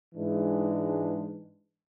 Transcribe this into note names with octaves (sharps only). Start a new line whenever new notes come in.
G#2 E3 G#3 D4